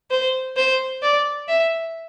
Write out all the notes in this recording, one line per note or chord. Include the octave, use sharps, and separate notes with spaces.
C5
C5
D5
E5